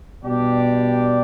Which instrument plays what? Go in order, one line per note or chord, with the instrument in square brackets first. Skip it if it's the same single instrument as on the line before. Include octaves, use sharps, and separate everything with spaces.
[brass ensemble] B2 G3 D4 G4 D5